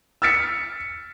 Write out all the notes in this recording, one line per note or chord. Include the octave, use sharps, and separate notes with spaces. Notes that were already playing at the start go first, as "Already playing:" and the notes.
E6 F6 A6 B6 C#7